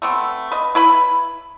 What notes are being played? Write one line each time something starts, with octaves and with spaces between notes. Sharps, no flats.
A3 B3 C4
B4 D#5
E4 B4 B5